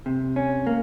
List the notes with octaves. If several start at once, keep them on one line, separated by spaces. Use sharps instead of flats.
C3
C#4
A#3